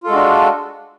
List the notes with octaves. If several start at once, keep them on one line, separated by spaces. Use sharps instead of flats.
G#3 D4 F4 F#4 A4